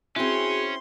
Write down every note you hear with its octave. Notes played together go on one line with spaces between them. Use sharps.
C4 C#4 E4 F#4 G#4 C6